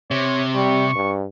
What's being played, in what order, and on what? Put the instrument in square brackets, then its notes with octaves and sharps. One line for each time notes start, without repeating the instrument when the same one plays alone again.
[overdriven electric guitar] C3 [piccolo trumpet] C#5
[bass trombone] G3 [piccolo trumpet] C#6
[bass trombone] G2